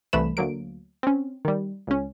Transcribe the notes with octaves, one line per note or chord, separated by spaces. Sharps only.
C2 E3 A3 B4 B5 E7
D2 F#3 A#3 D7
C4 C#4
D#3 G3
C#2 C#4